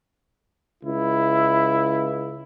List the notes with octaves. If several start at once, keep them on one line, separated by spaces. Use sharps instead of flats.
C#2 E4